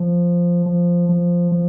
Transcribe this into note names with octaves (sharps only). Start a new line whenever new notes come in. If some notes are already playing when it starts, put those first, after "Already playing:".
Already playing: F3
F3
F3
F3